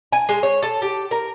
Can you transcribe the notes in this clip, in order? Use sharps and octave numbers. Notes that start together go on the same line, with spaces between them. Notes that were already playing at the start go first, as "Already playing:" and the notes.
G#5
G#3
C#5
A4
G4
A#4